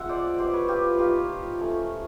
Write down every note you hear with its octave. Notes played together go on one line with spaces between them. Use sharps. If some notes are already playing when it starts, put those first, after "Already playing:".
Already playing: G#3 C4 D4 F4 E5 F#5
C5 D5
G3 B3 E4 C5 D5
B4 C#5
F4 G4
A#3 D#4 F4 G4
F3 A3 C#4 F4